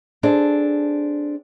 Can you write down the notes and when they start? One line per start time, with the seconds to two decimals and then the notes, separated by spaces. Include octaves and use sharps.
0.23 C4 D4 G#4 A4